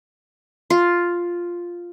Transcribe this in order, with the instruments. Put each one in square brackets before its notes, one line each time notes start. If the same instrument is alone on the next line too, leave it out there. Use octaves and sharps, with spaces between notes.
[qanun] F4